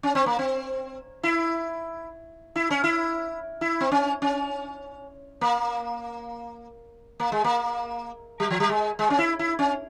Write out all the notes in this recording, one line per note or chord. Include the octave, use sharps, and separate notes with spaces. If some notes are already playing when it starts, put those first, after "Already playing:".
C#4
C4
A#3
C4
E4
E4
C#4
E4
E4
C4
C#4
C#4
A#3
A#3
G#3
A#3
G3
F3
G3
G#3
G#3
C#4
E4
E4
C#4